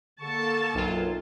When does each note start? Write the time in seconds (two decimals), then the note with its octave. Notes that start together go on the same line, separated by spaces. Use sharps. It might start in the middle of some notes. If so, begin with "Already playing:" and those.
0.21 D3 A#3 A4 A5 C#6
0.75 B1 F#2 F#3 F4